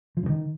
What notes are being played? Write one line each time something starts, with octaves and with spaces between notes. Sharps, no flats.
F3
G2
D#3